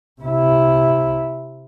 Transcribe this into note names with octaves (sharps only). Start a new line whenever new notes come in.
C3 E4